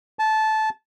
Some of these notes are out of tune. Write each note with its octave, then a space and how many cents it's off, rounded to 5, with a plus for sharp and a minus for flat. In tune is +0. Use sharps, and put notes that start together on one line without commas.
A5 -15